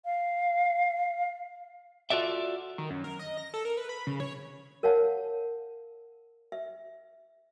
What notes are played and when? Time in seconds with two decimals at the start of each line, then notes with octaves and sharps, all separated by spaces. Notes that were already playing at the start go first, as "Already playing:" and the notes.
0.05 F5
2.10 F4 F#4 A4 D5 E5
2.78 D#3
2.90 F#2
3.04 A#4
3.19 D#5
3.37 A#6
3.54 A4
3.65 A#4
3.77 B4
3.89 B5
4.07 C#3
4.20 C#5
4.83 A#4 C#5 F5 F#5 A5
6.52 E5